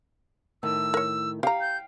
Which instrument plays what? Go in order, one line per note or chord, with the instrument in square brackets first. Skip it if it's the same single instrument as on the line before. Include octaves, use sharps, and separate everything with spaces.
[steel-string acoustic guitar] A2 D#3 [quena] E6
[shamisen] A#4 C#5
[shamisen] G4 A#5 [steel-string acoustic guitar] F5 G5
[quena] G6